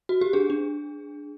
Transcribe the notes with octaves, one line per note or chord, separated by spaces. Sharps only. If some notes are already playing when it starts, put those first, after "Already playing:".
F#4
G4
D4 G#4
D4